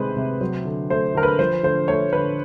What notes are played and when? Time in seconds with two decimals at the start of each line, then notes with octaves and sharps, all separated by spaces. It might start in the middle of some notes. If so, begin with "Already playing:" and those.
Already playing: C3 D#3 G#3 B4 C5
0.16 C3
0.41 F#3
0.65 D3
0.90 A3 C5
1.15 D3 A#4
1.23 B4
1.39 F3 C5
1.63 D3 C5
1.88 A3 C#5
2.13 D3 B4